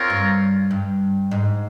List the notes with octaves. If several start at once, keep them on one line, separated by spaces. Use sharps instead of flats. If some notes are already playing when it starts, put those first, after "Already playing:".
Already playing: C4 F4 A#4 C#5
G2
G2
G#2